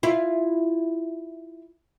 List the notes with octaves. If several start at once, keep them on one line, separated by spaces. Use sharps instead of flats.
E4 F4